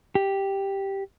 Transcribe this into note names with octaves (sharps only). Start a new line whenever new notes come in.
G4